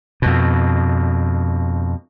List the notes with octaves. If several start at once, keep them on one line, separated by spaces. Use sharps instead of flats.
F2 B2